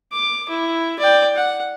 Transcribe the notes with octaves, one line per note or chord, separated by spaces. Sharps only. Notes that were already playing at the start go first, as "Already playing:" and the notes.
D6
E4
D5 G5
F#5